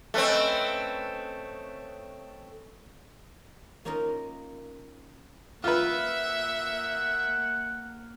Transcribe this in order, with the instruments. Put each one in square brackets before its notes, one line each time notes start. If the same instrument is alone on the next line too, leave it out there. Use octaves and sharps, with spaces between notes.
[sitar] A3 C4 [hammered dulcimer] C#4 B4 D#5
[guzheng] A#3 C#4 D#4 F4 A#4 D#5
[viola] A#3 [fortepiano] F4 B4 [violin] E5 [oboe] F#5